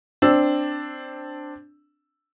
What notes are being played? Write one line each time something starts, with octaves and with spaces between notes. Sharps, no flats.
C4 D4 E6